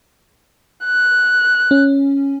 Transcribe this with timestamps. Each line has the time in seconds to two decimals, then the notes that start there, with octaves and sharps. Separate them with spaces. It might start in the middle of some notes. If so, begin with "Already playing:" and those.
0.85 F#6
1.71 C#4